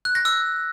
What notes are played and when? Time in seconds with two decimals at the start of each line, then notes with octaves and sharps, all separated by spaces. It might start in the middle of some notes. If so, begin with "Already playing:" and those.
0.05 F#6
0.15 A#6
0.25 E6